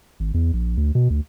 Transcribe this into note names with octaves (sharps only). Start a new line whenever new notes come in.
G#1
E2
A#1
D2
B2
D2